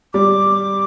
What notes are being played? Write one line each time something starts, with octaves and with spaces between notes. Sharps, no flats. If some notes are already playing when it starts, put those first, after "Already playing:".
G3 D6